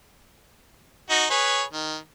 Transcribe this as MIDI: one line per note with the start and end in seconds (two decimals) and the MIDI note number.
1.10 1.25 63
1.10 1.25 66
1.30 1.63 68
1.30 1.63 71
1.30 1.63 73
1.73 1.97 51